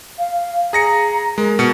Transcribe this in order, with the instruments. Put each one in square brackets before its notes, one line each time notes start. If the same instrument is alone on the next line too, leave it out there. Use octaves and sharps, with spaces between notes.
[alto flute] F5
[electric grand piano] G#4 A#6 C#7 [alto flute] A#5
[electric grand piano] G#3 [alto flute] A#4
[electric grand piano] B2 C#7